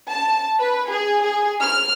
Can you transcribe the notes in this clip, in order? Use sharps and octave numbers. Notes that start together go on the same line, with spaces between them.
A5
B4
G#4
G#4
F6